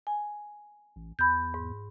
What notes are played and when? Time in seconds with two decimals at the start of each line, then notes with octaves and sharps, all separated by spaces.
0.07 G#5
0.96 A1
1.19 E2 B5 G6
1.54 G#2